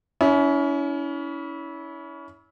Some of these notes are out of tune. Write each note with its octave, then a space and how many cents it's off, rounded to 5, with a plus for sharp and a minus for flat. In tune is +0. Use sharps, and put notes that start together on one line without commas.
C#4 +30 E4 -20